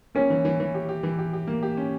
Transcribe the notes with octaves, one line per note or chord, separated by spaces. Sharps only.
A#3 C#4
E3
E3
E3
G4
G4
E3
G4
G4
A#3
G4
C#4